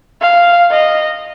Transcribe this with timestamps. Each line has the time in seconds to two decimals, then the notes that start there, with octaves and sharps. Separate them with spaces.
0.21 F5
0.71 D#5